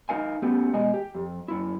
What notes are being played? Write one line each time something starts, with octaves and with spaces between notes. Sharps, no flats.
D#4 A#4 F5 G#5
A3 B3 C#4 G4
E2 B2 G#3 D#5 G#5
G4
F2
F#2 E4